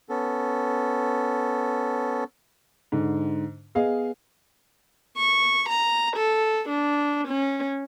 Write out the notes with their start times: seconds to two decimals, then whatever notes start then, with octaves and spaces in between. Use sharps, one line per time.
0.09 B3 C#4 A4
2.92 G#2 D3
3.75 B3 G#4 D#5 F5
5.17 C#6
5.69 A#5
6.17 A4
6.69 D4
7.28 C#4